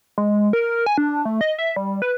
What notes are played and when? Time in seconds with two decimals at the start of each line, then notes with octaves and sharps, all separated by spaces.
0.18 G#3
0.53 A#4
0.86 G#5
0.98 D4
1.25 A3
1.41 D#5
1.59 E5
1.76 G3
2.02 B4